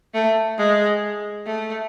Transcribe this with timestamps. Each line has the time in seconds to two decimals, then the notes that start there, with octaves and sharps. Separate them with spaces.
0.14 A3
0.58 G#3
1.46 A3